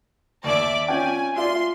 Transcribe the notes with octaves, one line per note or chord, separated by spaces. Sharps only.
D#2 D5 E5 D6
C#4 F4 G5 G#5
F4 D5 E5 C6